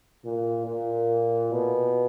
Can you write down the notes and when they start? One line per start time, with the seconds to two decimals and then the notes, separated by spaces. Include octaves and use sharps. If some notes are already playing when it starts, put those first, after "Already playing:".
0.24 A#2
0.67 A#2
1.52 B2